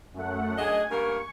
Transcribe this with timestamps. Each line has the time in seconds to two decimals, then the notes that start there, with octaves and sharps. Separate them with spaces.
0.14 F#2 A3 F#5
0.58 D4 G#4 D#5 G#5 G#6
0.91 G2 A#3 A#4 C#6